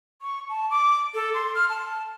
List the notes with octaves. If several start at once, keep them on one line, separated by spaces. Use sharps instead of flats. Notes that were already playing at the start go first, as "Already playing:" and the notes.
C#6
A5
D6
A4
C6
F6
A5